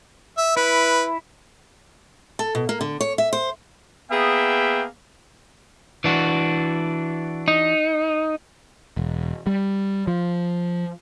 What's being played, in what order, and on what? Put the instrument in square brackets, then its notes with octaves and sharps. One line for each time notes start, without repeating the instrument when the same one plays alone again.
[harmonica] E5
[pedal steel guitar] E4 [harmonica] B4
[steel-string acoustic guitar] A4
B2
A#3
D3
C#5
E5
C5
[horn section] A#3 B3 G#4 E5 G5
[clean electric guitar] E3 D4 F#4
[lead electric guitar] D#4
[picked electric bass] E1
G3
F3